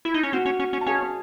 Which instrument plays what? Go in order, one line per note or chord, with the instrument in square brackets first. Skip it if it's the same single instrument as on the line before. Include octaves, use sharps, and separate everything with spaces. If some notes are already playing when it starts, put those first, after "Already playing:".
[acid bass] E4
D#4
C#4
[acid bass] C4 [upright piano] F#4 F#5
[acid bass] C#4
C#4
C#4
[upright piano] A5
[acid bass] C#4 [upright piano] G#4 G#5